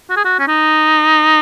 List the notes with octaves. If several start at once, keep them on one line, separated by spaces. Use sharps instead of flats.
F#4
G#4
F#4
C#4
D#4